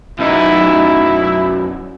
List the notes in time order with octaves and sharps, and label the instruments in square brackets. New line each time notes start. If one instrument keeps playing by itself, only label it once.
[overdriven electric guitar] F#2 D#4 [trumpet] E4